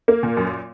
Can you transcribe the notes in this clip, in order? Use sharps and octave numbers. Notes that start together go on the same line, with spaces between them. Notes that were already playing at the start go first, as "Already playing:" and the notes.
A#3
A#2
F#2